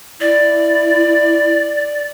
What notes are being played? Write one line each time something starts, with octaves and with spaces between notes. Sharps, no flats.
E4 D5